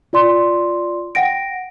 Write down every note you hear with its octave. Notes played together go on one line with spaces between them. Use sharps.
F4 D5 C6
F#5 G5 A#6 D7